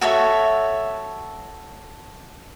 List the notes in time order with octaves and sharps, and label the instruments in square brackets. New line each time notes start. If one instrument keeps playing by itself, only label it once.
[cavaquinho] F#4 A4 C#5 E5